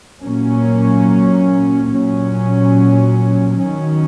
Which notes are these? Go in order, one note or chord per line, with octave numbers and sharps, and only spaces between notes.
A#2 F#3 A#3 C#4
A#2 F#3 C#4
D#3 F#3 C#4